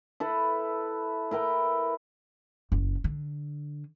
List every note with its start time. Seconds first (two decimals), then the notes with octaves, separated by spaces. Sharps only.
0.20 E4 A4 B4
1.31 E4 A#4 B4 G5
2.72 F#1
3.04 D3